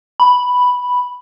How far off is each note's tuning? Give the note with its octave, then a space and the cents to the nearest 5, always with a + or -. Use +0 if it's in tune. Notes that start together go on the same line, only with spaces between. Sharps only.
B5 +0